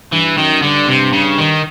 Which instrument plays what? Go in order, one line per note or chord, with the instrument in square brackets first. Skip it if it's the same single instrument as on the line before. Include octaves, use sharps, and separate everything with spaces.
[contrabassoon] G2 [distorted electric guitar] E3
[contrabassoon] F#2 [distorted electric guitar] D#3
[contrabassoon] G2 [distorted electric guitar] D3
[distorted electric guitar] C3
C#3
D#3